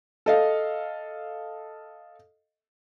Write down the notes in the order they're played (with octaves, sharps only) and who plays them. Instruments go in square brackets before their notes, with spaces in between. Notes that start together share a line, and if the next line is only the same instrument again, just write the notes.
[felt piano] A4 D#5 F5